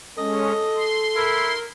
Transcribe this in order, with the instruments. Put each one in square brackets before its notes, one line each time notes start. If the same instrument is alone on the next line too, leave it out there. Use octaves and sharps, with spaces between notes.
[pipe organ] G#3 C#4 [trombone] A4 [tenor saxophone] D#5
[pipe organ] C6
[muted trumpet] E4 [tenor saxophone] A#4